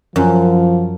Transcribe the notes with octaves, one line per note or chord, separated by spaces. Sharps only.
F#2 F3